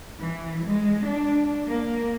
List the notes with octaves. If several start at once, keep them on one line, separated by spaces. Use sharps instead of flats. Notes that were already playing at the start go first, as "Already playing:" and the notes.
E3
G#3
D4
A#3